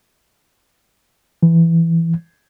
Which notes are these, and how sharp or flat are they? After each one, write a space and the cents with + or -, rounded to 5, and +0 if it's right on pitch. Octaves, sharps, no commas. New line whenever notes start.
E3 +10